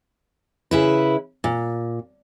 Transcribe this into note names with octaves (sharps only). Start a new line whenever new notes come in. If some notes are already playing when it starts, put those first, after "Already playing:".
C#3 E4 B4
A#2